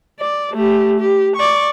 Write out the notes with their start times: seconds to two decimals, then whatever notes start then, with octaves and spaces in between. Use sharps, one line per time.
0.20 D5
0.53 A3 G4
1.00 G4
1.36 D5 C#6